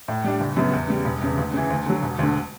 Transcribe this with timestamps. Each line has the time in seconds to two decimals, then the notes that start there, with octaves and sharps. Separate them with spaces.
0.08 A2
0.24 G3 D4
0.40 F#1
0.56 F#2 C#3 F#3 B3
0.73 E2
0.88 C#3 G3
1.05 E1
1.21 E2 C#3
1.37 D2
1.53 C#3 E3
1.70 D2
1.86 D3 F#3
2.03 E1
2.19 D2 D3